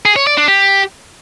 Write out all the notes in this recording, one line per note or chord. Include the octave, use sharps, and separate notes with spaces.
G#4
C#5
D5
D4
G4